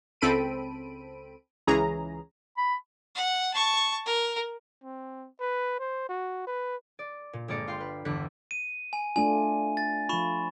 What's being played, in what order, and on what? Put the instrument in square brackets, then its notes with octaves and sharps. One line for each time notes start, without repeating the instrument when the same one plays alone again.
[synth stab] C#2 C4 A4 B5 D7 D#7
C#2 E3 C#4 G#4 A#5
[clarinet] B5
[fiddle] F#5
A5 C#6
A#4
[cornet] C4
B4
C5
F#4
B4
[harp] D5
A#2
G1 G#3 A#3 A#4 D5 C#7
F4 F5 G5 C6
B4
G1 E2 D3 F#6 B6
[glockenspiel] D#7
G#5
[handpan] A3 D4 F4 [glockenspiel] G#5
[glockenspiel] A6
[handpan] F3 F4 [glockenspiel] B5 C#6 E7